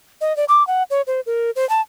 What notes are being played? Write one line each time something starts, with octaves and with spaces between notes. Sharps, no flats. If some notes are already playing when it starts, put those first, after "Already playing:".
D#5
D5
D6
F#5
C#5
C5
A#4
C5
A5